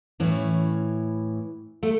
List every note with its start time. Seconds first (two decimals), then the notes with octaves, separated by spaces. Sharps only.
0.20 A2 E3 C#4
1.83 A3